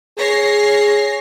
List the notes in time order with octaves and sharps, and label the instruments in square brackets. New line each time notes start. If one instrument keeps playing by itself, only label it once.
[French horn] G#4 [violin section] C#5 A#6 C7